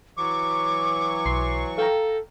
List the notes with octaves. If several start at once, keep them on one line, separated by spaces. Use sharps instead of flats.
E3 F#3 C#6 D6
B1 C6 C7
A4 F5 G5 A#5